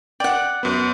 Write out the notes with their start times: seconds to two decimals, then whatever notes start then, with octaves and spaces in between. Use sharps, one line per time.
0.20 D5 F#5 G5
0.63 F#2 B3